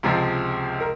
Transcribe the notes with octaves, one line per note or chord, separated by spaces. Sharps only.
C#2 C3 F3 G#3
A#4